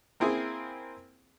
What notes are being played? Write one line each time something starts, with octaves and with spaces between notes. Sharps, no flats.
A#3 C4 E4 G#4